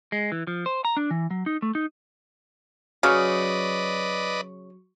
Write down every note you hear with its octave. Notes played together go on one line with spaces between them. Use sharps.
G#3
E3
F3
C5
A#5
D4
E3
F#3
D#4
A3
D#4
C#3 F#3 B4 D5 D#5 C#6